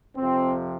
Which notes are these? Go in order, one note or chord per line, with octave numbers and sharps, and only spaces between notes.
F2 C3 F3 C4